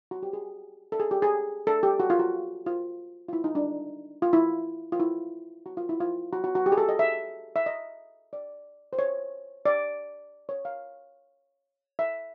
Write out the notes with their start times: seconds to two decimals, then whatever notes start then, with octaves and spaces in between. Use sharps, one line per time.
0.11 F#4
0.23 G4
0.33 G#4
0.92 A4
1.00 G#4
1.11 G4
1.22 G#4
1.67 A4
1.83 G4
2.00 F#4
2.10 F4
2.19 F#4
2.66 F4
3.28 F4
3.33 E4
3.44 D#4
3.55 D4
4.22 F4
4.33 E4
4.92 F4
5.00 E4
5.66 F#4
5.77 F4
5.89 E4
6.00 F4
6.33 F#4
6.44 F#4
6.55 F#4
6.66 G4
6.72 G#4
6.78 A4
6.89 D#5
6.99 E5
7.56 E5
7.66 D#5
8.33 D5
8.93 C5
8.99 C#5
9.66 D5
10.49 C#5
10.65 F5
11.99 E5